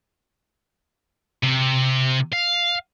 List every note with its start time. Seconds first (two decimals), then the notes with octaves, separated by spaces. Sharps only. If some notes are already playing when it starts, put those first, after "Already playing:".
1.43 C3
2.33 F5